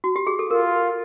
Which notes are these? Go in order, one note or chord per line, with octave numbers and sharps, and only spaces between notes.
F#4
G4
G#4
A4
F4 A#4